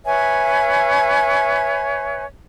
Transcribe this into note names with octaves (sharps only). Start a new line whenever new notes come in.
B4 C#5 E5 G#5